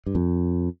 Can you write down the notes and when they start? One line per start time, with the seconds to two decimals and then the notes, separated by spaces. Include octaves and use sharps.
0.06 G2
0.15 F2